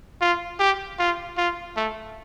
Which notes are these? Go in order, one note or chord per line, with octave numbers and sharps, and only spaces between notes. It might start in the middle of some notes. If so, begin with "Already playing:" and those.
F4
G4
F4
F4
A3